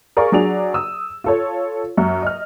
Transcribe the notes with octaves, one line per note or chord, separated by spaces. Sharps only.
G#4 A#4 D5 F5 C#6
F#3 D4 G#4 D5 F7
D#6 E6
F4 A4 C#5
F#2
D#5 F6